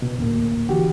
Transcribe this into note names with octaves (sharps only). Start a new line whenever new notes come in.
B2
D2 A2 A#3
D3 E3 F#4 G4